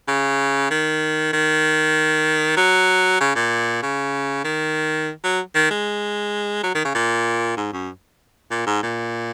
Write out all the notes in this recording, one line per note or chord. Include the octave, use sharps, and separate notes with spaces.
C#3
D#3
D#3
F#3
C#3
A#2
C#3
D#3
F#3
D#3
G#3
F#3
D#3
C#3
A#2
G#2
F#2
A#2
G#2
A#2